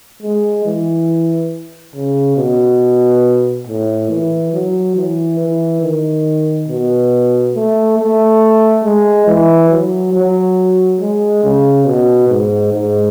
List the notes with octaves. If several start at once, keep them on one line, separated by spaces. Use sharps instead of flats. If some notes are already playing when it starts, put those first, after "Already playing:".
G#3
E3
C#3
B2
A2
E3
F#3
E3
E3
D#3
B2
A3
A3
G#3
E3
F#3
F#3
G#3
C#3
B2
G#2
G#2